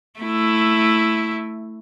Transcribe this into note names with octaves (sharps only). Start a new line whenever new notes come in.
A3 E4